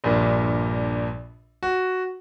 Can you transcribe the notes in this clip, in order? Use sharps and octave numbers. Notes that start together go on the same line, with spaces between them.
A#1 G2 A#2
F#4